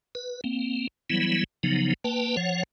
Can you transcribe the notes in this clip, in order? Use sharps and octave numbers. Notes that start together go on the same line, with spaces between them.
B4
A#3 C4
E3 F#3 G3 B3 E4
C#3 F3 F#3 B3 D#4
A#3 B4 G5 A5
F3 C#5 F#5